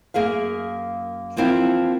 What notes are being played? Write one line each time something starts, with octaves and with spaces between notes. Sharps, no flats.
F#2 A#3 G#4 E5 F5
E3 F3 A#3 C4 E4 F4